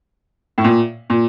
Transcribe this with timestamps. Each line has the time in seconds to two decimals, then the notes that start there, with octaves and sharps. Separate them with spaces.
0.58 A2
0.64 A#2
1.10 A#2